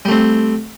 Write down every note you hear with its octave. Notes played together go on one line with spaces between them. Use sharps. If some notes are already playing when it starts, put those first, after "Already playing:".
G3 A3 C4